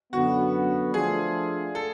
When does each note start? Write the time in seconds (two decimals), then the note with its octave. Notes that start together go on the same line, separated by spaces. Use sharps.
0.13 F#2 D3 F#3 B3 F#4
0.94 F3 A3 D4 F4 G#4 A4
1.75 A4